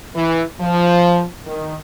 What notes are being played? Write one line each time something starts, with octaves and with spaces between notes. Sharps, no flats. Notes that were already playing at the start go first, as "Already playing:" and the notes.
E3
F3
D#3